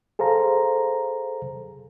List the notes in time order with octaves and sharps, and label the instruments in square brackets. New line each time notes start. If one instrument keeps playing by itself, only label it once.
[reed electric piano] G#4 A4 C5 F5 A#5